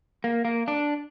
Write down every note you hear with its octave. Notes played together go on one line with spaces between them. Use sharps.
A#3
A#3
D4